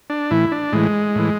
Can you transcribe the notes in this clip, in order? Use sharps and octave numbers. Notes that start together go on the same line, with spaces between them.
D4
A2 E3 E4
D4
A2 E3 G#3
A2 E3